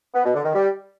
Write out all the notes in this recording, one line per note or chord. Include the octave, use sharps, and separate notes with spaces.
B3
B2
D3
D#3
G3